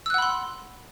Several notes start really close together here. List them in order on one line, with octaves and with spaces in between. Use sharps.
E6 F#6 F#5 B5 C6